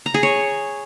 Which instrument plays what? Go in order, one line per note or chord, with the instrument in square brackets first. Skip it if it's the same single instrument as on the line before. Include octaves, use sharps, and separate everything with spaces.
[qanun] A#5
G#4
C#5